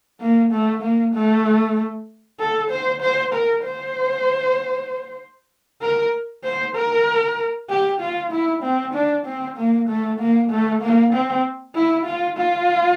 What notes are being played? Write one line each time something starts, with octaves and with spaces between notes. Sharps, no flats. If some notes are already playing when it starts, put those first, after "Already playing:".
A#3
A3
A#3
A3
A4
C5
C5
A#4
C5
A#4
C5
A#4
G4
F4
E4
C4
D4
C4
A#3
A3
A#3
A3
A#3
C4
E4
F4
F4